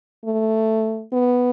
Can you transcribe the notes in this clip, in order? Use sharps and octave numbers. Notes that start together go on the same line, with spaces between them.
A3
B3